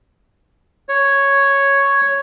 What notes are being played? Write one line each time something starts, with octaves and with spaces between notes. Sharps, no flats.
C#5